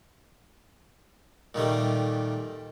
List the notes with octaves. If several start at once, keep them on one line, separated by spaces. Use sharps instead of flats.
A#2 D#3 G3 A3